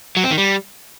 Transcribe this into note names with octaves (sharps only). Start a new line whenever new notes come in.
F#3
C4
D#3
G3